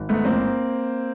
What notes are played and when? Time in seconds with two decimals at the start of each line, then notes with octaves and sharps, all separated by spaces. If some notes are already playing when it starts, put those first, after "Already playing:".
Already playing: G#1
0.09 G#2 A3 B3
0.25 A1 A#3 C4